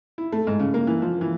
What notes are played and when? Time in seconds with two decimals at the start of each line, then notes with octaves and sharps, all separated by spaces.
0.18 E4
0.32 A3
0.47 G#2
0.59 C#3
0.74 A#3
0.87 E3
1.02 F3
1.21 E3